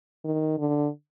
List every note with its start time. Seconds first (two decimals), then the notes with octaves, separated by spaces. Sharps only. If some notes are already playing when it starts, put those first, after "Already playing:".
0.25 D#3
0.58 D3